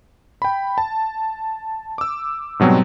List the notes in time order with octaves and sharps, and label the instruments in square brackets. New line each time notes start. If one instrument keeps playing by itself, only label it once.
[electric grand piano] G5 B5
A5
D6 E6
G#2 B2 F#3 G3 C4